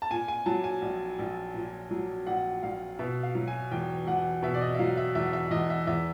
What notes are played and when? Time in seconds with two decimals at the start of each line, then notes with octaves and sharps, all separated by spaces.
0.02 A5
0.11 A#2 G#5
0.28 G#5
0.46 F#3 A5
0.64 G#5
0.82 A#1
1.19 A#1
1.54 A#2
1.91 F#3
2.27 A#1 F#5
2.63 A#1 F5
2.99 B2 E5
3.23 F5
3.35 F#3
3.47 G#5
3.71 E2 G5
4.07 E2 F#5
4.43 B2 E5
4.54 D5
4.61 D#5
4.74 E5
4.79 F#3 F5
4.97 E5
5.15 E2 E5
5.33 E5
5.51 E2 D#5
5.70 E5
5.87 E2 E5